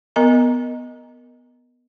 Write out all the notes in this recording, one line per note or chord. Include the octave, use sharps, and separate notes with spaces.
B3 A#4 D#5 A#5